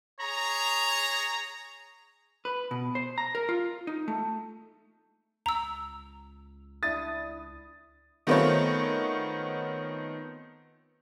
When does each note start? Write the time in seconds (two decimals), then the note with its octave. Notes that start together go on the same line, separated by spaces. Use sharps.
0.20 G#4 C#5 A#5
2.45 B4
2.71 B2
2.95 C5
3.18 A#5
3.35 A#4
3.49 F4
3.87 D#4
4.08 A3
5.46 C#2 A#5 E6
6.83 D4 E4 D#6 A6
8.27 D#3 A3 B3 C4 F4 C#5